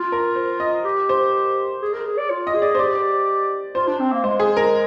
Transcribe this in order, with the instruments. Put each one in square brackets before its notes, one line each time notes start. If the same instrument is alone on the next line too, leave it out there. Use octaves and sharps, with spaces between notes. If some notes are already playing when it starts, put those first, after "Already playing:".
Already playing: [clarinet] F4
[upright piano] A#4
C5
D#5
[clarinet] G4
[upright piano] C5
[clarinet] G#4
A#4
G#4
D5
F4
[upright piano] D#5
[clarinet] G#4
[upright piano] D5
C5
[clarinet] G4 [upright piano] D5
[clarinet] F4 [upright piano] C5
[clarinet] D4
C4
A#3
[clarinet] G#3 [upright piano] C5
[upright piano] G#4
A#4